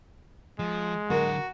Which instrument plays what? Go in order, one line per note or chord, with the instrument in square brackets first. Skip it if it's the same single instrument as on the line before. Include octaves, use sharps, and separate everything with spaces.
[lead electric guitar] F3 [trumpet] G#3
[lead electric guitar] D3 F#3 [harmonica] F#4 [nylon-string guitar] A#4